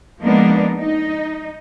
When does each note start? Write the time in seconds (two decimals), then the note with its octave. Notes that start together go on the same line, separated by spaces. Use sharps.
0.21 F3 G#3 A#3 B3 D4 D#4
0.80 D#4